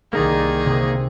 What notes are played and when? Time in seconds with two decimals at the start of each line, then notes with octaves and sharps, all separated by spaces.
0.13 C2 D#3 A#3 D#4 G#4 D5
0.66 C3